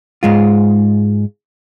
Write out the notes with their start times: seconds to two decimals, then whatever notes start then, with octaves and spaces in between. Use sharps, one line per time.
0.23 G#2 G#3 F4